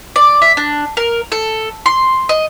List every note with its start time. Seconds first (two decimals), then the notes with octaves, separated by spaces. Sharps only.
0.16 D5
0.42 E5
0.57 D4
0.97 A#4
1.32 A4
1.86 C6
2.29 D#5